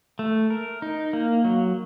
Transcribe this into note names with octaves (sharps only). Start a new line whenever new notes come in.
A3
A#4
D#4
A#3
F#3